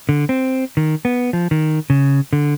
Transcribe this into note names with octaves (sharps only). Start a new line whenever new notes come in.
D3
C4
D#3
B3
F3
D#3
C#3
D3